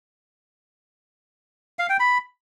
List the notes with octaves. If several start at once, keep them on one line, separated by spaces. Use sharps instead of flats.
F5
G5
B5